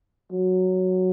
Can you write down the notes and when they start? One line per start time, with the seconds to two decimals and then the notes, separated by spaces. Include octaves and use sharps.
0.32 F#3